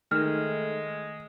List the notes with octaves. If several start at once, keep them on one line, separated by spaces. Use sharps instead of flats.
D#3 G#3 A3 F6